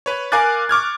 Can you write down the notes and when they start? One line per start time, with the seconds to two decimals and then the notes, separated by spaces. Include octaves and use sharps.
0.06 B4 C#5
0.32 A#4 F5 G#5 D6 F#6 A6
0.69 C#6 D6 F6 G#6